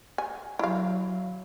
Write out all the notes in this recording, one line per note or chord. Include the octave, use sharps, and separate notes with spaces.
G#5
F#3 E4 F5